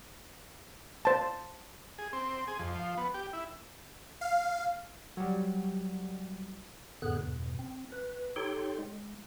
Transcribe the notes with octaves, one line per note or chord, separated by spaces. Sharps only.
C5 A5
G#4
C4
G#4
F2
F3
B3
G4
E4
F5
F#3 G3
F2 A2 D3 B3 G#4 F#6
E2 G2 B2
C4
B4
D#4 G4 A4 C#5 G5 C6
G#3